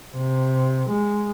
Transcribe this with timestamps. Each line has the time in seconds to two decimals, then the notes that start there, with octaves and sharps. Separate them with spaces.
0.15 C3
0.90 G#3